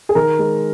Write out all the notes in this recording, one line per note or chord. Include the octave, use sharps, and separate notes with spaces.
G#4
D#3 A#4
G#3